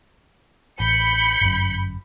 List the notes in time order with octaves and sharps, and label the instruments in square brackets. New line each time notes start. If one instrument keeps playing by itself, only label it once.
[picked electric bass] A1 [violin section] B5 G6 C#7
[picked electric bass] G1 F#2